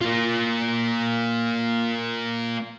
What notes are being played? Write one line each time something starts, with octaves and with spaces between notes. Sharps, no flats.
A#3 F4